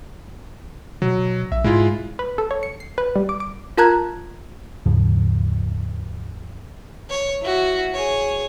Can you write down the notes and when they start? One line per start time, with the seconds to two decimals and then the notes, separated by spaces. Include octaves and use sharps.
1.02 B2 F#3
1.52 A#1 E5
1.64 G#2 G#3 E4 F4
2.19 B4
2.38 A4
2.51 C#5
2.63 C#7
2.80 C7
2.98 B4
3.16 G3
3.29 D6
3.40 D6
3.78 F4 A#4 A5 A#5 F#6 G#6
4.86 D#2 G#2 C#3 F3
7.10 C#5
7.42 E4 F#4
7.94 G#4 C#5